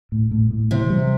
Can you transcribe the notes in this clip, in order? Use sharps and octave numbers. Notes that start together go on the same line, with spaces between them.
A2
A2
A2
C3 E3
G3